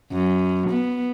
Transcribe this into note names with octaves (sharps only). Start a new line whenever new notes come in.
F#2
B3